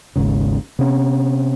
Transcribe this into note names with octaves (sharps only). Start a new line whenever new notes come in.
G#1 D#2 G#2 C#3
C3 B3 C#4